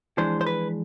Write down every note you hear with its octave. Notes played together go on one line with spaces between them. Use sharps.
F2 E3 G#3 D4 C5
C5
B4